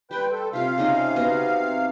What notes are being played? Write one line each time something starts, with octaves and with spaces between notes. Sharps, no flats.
G3 B4 G5 C6
A4
C3 F4 G4 F5
C#3 D#4 G#4
B3 F#4 D#5